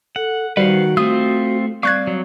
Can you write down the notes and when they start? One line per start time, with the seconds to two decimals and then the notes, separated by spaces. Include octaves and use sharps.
0.16 A4 F#5
0.57 D#3 G3 F#4 B4 C5 F5 F#5
0.97 A3 C4 F4 D#6
1.83 G3 C4 D5 F5 C#6 F#6 G#6
2.07 F#3